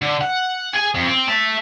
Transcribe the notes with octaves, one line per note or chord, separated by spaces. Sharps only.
D3
F#5
G#4 G#5
F2
C4
E5 A5